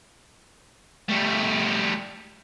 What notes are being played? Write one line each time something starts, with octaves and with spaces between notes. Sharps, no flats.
G3 A3